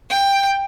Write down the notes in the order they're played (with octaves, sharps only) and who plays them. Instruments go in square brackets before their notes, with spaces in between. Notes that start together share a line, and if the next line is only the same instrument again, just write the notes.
[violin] G5